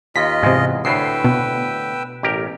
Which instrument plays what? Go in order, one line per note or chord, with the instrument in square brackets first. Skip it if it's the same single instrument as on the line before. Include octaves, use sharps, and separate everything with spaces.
[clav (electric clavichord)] D#2 [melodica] F4 D#5 [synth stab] B6
[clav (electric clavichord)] E2 G#3 [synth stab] G#2 C3
[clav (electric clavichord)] D2 A2 [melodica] B4 G5 E6 [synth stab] C7
[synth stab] B2
[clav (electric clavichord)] A1 G4 A#4